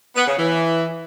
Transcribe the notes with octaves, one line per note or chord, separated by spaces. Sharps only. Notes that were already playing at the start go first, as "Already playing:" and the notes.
B3
C#3
E3